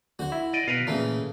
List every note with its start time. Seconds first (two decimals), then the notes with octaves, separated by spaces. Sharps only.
0.19 D2 F#4 C5
0.32 E4
0.53 D5 D#5
0.68 B2 F4 A#4 B4
0.87 A#2 C#3 E3 A3